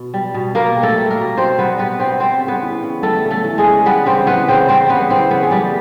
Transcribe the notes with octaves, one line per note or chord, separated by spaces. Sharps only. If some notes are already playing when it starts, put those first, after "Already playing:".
Already playing: B2
G3
B2
B2 A#3 A#4
G3
A3 A4
G3
A#3 A#4
B2
B2 C4 C5
G3 B3 B4
G3 B3 B4
B2 C4 C5
G3 C4 C5
C#3
B3 B4
E3
C#3
G3 A3 A4
C#3
A3 A4
E3
G#3 G#4
C#3
G3 B3 B4
C#3 C4 C5
E3 B3 B4
C#3 C4 C5
G3 C4 C5
C#3 B3 B4
E3 C4 C5
C#3 B3 B4
G#4
G3 A3 G4